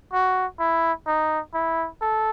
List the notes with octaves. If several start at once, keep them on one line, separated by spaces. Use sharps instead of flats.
F#4
E4
D#4
E4
A4